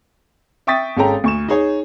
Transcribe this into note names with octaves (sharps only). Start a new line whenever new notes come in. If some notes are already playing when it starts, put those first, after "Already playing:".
E5 G5 C#6 D#6 A6 B6
G#1 G#3 C#4 A4 G5 A#5
D2 C#6 E7
D#4 G#4 C#5